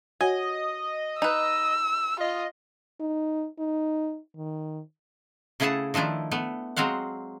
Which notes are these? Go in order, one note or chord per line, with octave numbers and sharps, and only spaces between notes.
F#4 C#5 D#5 F#5 G#5
D#4 B4 E6
F4 D#5
D#4
D#4
D#3
C#3 A3 E4 G#4 F#5 A5
D#3 F3 A3 D4 E4
A3 B3
F#3 G#3 C4 F5 F#5